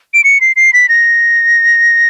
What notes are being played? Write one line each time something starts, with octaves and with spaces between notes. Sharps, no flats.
D7
C#7
C7
C7
B6
A#6